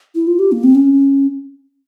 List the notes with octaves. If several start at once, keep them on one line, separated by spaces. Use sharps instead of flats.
E4
F4
G4
A#3
C4
C#4